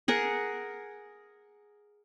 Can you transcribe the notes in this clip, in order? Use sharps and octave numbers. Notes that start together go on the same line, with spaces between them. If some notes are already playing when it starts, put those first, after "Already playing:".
G#4 A#4 F#5